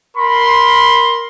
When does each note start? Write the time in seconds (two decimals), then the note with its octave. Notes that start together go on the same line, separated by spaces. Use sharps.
0.17 A#4 B5 C6